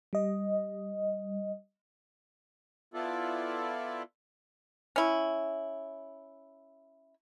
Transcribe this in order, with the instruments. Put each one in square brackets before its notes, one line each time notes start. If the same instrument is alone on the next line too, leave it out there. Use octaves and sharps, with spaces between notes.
[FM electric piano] G3 D#5
[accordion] B3 E4 F4 A4 D5
[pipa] C#4 E4